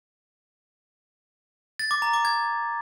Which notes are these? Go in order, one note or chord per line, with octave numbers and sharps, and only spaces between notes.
A6
D6
A#5
D6
G#6